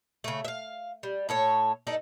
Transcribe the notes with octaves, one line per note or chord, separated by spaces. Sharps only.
C#3 A3
E5 F5
G3
A2 A4 C#5
D#4 A4 D5